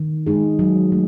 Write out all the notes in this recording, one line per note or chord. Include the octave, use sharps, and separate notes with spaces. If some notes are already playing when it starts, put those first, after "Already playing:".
Already playing: D#3
G#3 D#4 G#4
F#3
A3